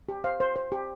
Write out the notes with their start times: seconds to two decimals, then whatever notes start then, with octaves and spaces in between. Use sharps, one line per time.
0.09 G4
0.24 C5 F5
0.40 C5
0.56 C5
0.72 G4